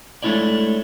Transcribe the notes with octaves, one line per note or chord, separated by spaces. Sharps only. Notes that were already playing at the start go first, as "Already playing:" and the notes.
G#3 A3 D4 E4 C#5 D5